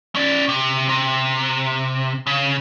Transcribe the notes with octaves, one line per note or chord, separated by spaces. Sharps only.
C#4 D5
C3
C3
C#3